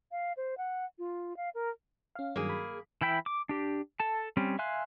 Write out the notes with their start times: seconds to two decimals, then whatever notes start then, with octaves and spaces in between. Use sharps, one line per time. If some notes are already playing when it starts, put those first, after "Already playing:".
0.12 F5
0.37 C5
0.58 F#5
0.99 F4
1.37 F5
1.54 A#4
2.15 C#4 F5
2.36 G2 D#3 F#3 A#3 G#4
2.49 B5
3.01 E3 E4 G5 B5
3.26 D6
3.49 D4 G4
4.00 A4 A5
4.37 G3 C4 C#4
4.59 E5 F5 G#5 C6 F#6